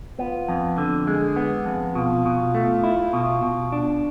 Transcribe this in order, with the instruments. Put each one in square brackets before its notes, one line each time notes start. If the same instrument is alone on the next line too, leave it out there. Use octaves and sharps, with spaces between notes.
[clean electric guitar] B3 [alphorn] F4
[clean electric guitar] F2
D3
[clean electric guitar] G#3 [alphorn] G#4
[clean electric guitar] B3
F2
[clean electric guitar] B2 [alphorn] F4
[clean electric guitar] B2
A3
E4
B2
B2
D4